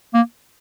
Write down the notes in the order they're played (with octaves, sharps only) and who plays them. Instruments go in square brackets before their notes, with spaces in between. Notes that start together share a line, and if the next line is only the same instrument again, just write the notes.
[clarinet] A#3